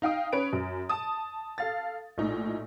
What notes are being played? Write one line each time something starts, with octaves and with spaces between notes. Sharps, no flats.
D#4 F5 G5 D#6
C#4 B4 D7
F#2
A5 D#6
A4 F5 A6
A#1 A2 D#4